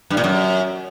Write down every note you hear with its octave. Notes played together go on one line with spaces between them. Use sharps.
G2
A#2
F#2